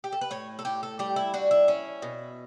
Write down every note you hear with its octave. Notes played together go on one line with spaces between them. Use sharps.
G4
A4
B4
A2 C#5
A4
A2 G4
A4
G3 G4
E4
D4 F#4
E4
C#4
B2